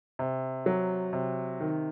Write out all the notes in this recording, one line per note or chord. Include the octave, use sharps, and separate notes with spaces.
C3
F#3
C3
D#3